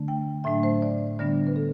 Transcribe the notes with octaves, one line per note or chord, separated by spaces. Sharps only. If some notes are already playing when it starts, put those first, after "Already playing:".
Already playing: D3 A3 D4
G5
A2 F#3 A3 D4 E5
C5
D5
D3 G3 B3 D4 D5
B4
A4